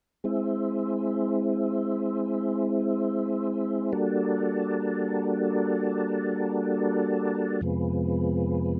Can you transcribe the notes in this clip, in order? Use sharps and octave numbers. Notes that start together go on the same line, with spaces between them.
G#3 C4 E4
G3 A#3 D4 F#4 A4
F2 C3 F3 G#3 B3